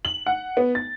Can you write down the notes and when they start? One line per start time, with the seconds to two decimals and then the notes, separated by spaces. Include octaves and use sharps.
0.05 F#7
0.26 F#5
0.57 B3
0.75 A6